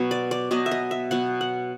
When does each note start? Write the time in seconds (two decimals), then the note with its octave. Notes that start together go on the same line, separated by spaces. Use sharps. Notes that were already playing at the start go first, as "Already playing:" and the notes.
Already playing: B2 F#3 B3
0.11 D5
0.31 D5
0.51 B2 F#3 B3 D#5
0.66 E5
0.71 D#5
0.91 E5
1.11 B2 F#3 B3 F#5
1.41 F#5